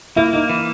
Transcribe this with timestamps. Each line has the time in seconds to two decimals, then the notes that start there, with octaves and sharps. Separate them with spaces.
0.16 A#3 E4
0.33 A#3 D#4
0.49 E3